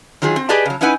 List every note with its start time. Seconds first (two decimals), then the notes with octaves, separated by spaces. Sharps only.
0.22 D#3 F#3 F4 G#4
0.36 C4
0.49 G4 G#4 B4 D5 D#5 A5
0.66 C#3 F#3
0.81 C#4 D#4 E4 B4 F#5 G#5